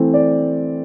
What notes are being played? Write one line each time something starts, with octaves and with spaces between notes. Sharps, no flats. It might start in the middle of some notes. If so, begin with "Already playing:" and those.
Already playing: E3 A3 C4
D5